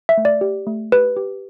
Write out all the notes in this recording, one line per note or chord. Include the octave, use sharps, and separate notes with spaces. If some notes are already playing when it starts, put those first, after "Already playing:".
E5
A3
D5
G4
A3
G4 B4
G4